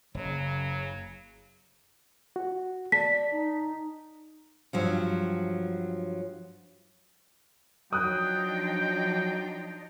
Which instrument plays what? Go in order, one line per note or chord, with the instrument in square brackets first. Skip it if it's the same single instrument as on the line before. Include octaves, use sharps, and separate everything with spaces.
[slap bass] F#1 [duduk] C#3 [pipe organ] F#3
[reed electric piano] F#4
[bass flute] D5 [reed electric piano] A5 [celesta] B6
[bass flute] D#4
[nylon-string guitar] G2 F3 F#3
[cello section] F3 D4 D#4 [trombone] F#3 [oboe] G5 [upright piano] D#6 F#6